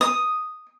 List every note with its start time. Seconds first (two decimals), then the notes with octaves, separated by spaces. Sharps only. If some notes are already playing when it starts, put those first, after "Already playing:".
0.01 D#6